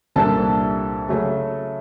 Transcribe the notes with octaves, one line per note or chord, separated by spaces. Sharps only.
C2 A#2 G3 A#3 D4 A4 A5
C#3 F#3 A3